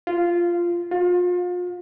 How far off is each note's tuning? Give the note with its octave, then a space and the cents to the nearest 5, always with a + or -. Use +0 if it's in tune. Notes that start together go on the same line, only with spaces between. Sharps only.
F4 -10
F4 +35